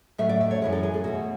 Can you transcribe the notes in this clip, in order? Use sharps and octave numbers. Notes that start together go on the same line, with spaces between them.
A2 F#3 A3 E5
D5
E5
C#5
F#2 E3 G#3 C#5
A4
G#4
G#4
B2 A3 F#4